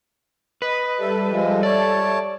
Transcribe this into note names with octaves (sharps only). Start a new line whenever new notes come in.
B4 D#5 B5
G3 A4 E5
F3 G#3
C#5 D5 A5